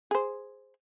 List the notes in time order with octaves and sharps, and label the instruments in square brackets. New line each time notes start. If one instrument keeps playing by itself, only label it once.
[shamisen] G#4 C5